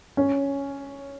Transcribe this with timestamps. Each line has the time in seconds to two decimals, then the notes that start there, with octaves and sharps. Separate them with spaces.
0.17 C#4